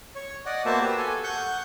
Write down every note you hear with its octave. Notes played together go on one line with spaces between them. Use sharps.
C#5
D5 D#5 F#5
A#3 B3 F#4 C5 E5 A5
G4 B4 E6
A4 G#5
F#5 C#6 G6